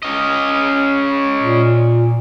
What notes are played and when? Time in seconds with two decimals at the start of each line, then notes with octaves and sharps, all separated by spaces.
0.03 C#4 D#5
1.42 A#2